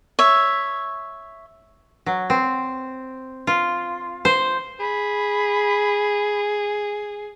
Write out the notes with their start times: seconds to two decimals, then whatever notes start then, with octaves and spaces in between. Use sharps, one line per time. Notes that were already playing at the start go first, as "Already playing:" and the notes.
0.19 C#5 E5
2.06 F#3
2.30 C4
3.47 F4
4.25 C5
4.80 G#4 B5